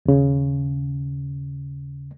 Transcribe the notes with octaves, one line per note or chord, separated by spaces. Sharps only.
D#2 C#3